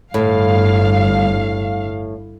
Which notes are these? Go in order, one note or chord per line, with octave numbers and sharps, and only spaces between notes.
G1 A2 F5